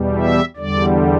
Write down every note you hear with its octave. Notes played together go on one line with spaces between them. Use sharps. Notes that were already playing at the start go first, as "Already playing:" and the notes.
Already playing: E2 B2 G3
E5
E2 D3 G3 D5